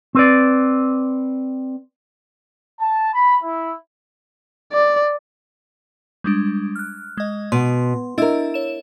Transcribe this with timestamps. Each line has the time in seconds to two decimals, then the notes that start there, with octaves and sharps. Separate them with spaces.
0.15 C4 B4 D5
2.80 A5
3.14 B5
3.43 E4
4.72 D5
6.24 G3 G#3 D4
6.76 F6 F#6
7.17 G#3 D#5
7.52 B2 C6
8.18 D4 E4 A#4 D#5 E6
8.54 C#5 E7